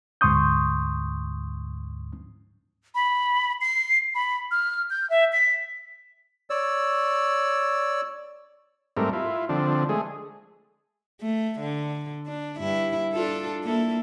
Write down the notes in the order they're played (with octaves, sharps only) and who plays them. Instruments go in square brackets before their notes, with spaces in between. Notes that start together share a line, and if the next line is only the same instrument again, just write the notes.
[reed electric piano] D2 G#2 C6 C#6 D#6 G6
[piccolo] B5
C7
B5
F6
G6
E5
B6
[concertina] C#5 D5 E6
[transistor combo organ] G#2 G3 A3 C4 A#4
E4 F4
D3 F3 C4 D4
G#3 A3 G#4
[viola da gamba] A3
D3
D4
G2 E4
D4 F4 A4
A#3 E4 A4